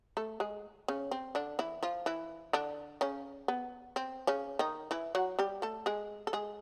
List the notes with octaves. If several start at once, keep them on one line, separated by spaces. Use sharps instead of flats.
A3 A4
G#3 G#4
C#3 C#4
C4
D3 D4
E3 E4
F3 F4
E3 E4
D3 D4
C#3 C#4
B3
C4
C#3 C#4
D#3 D#4
E3 E4
F#3 F#4
G3 G4
A3 A4
G#3 G#4
A4
G#3 G#4